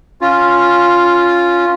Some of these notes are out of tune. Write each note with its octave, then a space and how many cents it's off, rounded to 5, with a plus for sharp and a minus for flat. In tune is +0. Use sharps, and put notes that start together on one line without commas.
C#4 +0 F4 +0